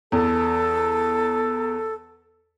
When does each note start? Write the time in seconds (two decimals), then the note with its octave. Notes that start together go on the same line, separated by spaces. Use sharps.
0.12 E2 A4